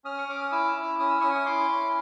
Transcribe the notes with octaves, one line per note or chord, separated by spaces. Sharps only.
C#4 D#6 F6
C#6
C#4 D6
D#6
E4 D6 E6
E4
C#4 D#6
E6
C#4 C#6 D#6
C#6
E4 C6 D6
C#4